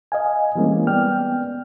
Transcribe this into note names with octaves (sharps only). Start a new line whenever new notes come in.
D#5 F5 G#5
E3 G3 G#3 A#3 C4 C#4
B3 D5 G5 F6